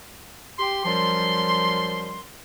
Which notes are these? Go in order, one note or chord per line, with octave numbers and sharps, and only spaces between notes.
G4 C6
F#2 F3 G3 C6